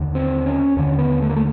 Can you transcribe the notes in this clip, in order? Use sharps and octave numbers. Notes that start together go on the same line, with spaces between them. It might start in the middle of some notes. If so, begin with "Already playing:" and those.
Already playing: D#2 D3
C4
C#4
D#2 D3 C#4
B3
A3
A#3
A3